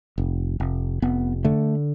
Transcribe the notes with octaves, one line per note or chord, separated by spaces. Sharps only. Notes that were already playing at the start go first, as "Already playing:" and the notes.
F1
F1
F1 B3
D3 A3